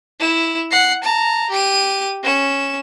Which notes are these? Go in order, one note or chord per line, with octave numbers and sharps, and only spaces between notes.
E4 E7
F#5 C7
A5 A#5
G4 D#7
C#4 E7